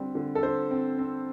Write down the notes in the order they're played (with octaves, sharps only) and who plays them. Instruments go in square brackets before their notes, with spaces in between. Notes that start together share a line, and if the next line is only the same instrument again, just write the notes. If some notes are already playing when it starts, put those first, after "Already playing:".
Already playing: [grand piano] D3 G3 C4
D3
A4
D3 C5
C4
C4